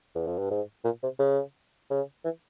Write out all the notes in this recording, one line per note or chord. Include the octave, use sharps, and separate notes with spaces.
E2
F2
G2
G#2
A#2
C3
C#3
C#3
E3